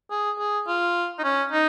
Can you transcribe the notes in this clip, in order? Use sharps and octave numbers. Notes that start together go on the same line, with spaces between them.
G#4
G#4
F4
D#4
C#4
D#4